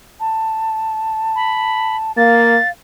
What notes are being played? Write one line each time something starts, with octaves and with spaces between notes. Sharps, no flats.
A5
B5
A#3 F5 A6